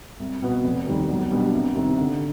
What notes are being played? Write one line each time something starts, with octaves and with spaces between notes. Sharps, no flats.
C2
B2 B3
F1
D#2 D#3 G3
B1
B2 G3 B3 D4
C2
C3 D#3
D3